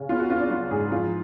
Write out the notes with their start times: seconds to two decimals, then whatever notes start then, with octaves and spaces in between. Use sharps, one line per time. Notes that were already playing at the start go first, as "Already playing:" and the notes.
Already playing: C#3
0.09 B3 F4
0.19 F#4
0.30 B3 F4
0.40 D4
0.50 F#3 F4
0.70 G#2 G#4
0.92 F3 F4